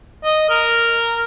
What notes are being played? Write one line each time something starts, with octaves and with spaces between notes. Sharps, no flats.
D#5
A#4